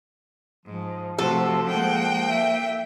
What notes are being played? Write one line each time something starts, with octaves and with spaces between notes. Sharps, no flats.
G#2 F3
C3 A3 F#4 A4
G#3 A#3 F#5 G5
E5